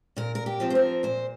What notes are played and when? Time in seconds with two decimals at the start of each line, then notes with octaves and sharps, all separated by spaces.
0.16 A#2 A#4
0.35 A#4
0.46 G4
0.60 F3 C4 F4
0.70 C5
0.75 A#4
1.03 A#2 C5